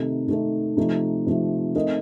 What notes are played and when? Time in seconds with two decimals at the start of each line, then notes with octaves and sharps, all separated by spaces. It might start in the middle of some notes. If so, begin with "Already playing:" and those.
Already playing: C3 D#3 A3 D#4 A4
0.28 C3 D#3 A3 D#4 A4
0.77 C3 F3 A3 C4 D#4
1.26 C3 F3 A3 C4 D#4
1.75 A3 C4 D#4 A#4 D#5